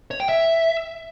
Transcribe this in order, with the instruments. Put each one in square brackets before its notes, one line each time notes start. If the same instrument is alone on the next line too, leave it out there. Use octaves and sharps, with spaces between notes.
[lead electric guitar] C#5
G5
E5